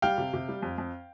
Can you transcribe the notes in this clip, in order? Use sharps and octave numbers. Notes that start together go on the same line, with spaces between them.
G3 F5 G5
C3
C3
G3
F2
F2